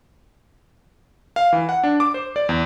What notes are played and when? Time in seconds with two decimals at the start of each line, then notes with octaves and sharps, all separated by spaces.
1.36 F5
1.53 E3
1.69 F#5
1.84 D4
2.00 D6
2.14 C5
2.36 D5
2.49 E2